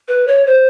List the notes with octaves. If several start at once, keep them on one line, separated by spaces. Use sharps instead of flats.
B4
C#5
C5